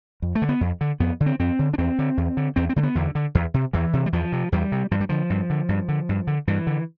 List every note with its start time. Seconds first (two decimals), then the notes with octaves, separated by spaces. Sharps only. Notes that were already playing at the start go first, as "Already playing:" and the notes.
0.22 F2
0.35 A3
0.42 D3
0.49 B3
0.61 F2
0.81 D3
1.00 F2 B3
1.20 D3
1.26 C4
1.39 F2 C4
1.59 D3
1.73 D4
1.78 E2 C4
1.99 D3
2.17 E2
2.37 D3
2.56 E2 C4
2.69 C4
2.76 D3 A3
2.83 B3
2.95 E2 D3
3.15 D3
3.35 E2
3.54 C3
3.73 E2 E3
3.93 C3
4.06 G3
4.13 E2 F3
4.32 C3
4.52 E2 G3
4.72 C3
4.91 G2 F3
5.01 G3
5.09 D3 F3
5.30 G2
5.50 D3
5.69 G2
5.88 D3
6.09 G2
6.27 D3
6.47 G2 E3
6.67 D3